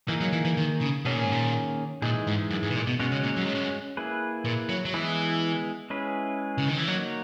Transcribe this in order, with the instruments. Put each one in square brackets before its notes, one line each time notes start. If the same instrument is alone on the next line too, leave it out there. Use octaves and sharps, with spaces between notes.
[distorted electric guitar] E3 [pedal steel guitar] A#3 D#4 G#4
[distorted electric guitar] F#3
E3
E3
D#3
C#3
[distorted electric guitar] B2 [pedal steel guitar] D#3 A#3 C#4 G#4
[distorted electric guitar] A#2
G#2
A#2
[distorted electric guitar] A#2 [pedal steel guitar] E3 G#3 D#4 G#4
[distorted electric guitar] G#2
F#2
G#2
B2
A#2
B2
[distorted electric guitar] B2 [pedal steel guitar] G#3 C#4 F#4 C#5
[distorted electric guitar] C#3
A#2
F#2
G#2
F#2
[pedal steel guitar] A#3 E4 G#4 B4
[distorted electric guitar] A#2
F#3
F#3
[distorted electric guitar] E3 [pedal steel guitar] G#3 B3 E4 G#4
[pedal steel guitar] G#3 C#4 E4 G#4 B4
[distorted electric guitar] C#3
D#3
E3
[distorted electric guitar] F#3 [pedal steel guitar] A#3 D#4 F#4 C#5